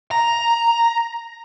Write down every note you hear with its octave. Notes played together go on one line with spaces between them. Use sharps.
A#5